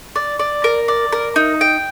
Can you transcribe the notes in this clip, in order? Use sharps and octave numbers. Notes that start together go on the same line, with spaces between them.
D5
D5
A#4
D5
A#4
D#4
G5